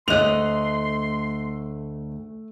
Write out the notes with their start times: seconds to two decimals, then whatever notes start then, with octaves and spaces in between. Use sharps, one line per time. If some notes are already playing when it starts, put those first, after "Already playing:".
0.08 D2 A3 D#5 C6 F#6 F7